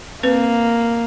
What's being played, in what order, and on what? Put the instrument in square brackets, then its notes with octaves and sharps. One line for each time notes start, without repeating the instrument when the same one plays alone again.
[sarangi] A#3 [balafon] C4 B4